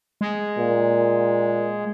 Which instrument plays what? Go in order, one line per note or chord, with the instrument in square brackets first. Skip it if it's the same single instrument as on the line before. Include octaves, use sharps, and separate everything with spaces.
[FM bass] G#3
[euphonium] A#2